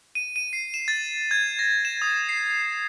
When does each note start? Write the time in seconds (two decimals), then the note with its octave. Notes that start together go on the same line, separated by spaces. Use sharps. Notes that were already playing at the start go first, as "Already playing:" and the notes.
0.15 D#7
0.36 D#7
0.53 C7
0.74 E7
0.88 A6
1.31 G#6
1.59 A#6
1.85 E7
2.02 D#6
2.29 C7